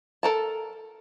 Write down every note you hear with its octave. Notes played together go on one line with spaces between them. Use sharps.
A4 A#4 A5